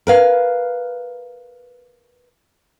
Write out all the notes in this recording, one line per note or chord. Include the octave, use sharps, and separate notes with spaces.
A#4 B4 F5